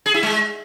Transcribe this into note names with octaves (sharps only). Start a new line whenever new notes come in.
G#4
E4
G#3